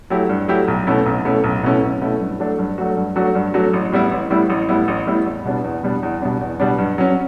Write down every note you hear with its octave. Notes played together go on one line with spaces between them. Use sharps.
F#3 A3 E4 G4
G2
F#3 A3 E4 G4
B1
B2 A3 C#4 E4
B1
B2 A3 C#4 E4
B1
B2 A3 C#4 E4
B1
B2 A3 C#4 E4
G2
F#3 A3 D4 F#4
G2
F#3 A3 D4 F#4
G2
F#3 A3 D4 F#4
G2
F#3 A3 D4 F#4
A1
A2 G3 B3 E4
A1
A2 G3 B3 E4
A1
A2 G3 B3 E4
A1
A2 G3 B3 E4
E2
B2 G3 B3 D4
E2
B2 G3 B3 D4
E2
B2 G3 B3 D4
E2
B2 G3 B3 D4
G2
F#3 C#4